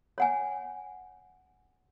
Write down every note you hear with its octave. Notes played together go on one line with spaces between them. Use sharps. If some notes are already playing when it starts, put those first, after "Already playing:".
C#5 F#5 G#5